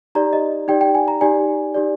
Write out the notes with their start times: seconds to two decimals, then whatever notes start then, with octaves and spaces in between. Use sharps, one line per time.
0.15 D#4 G4 D5 A#5
0.33 D#5
0.68 D#4 G4 D5 G5
0.81 G5
0.95 G#5
1.08 A#5
1.21 D#4 G4 D5 G#5
1.74 D#4 G4 D5